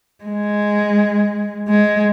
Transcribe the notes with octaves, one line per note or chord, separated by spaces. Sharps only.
G#3
G#3